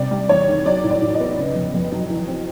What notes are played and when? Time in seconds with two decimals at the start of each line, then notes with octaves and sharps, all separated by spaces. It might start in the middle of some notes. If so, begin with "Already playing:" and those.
Already playing: C3 G3 D5
0.11 G3
0.29 E2 C#5
0.48 D#3
0.66 F#3 D5
0.84 A2
0.90 D5
1.02 A2
1.14 D#5
1.20 B3
1.38 C#3
1.55 F2
1.74 F2
1.92 F#3
2.10 E3
2.28 C4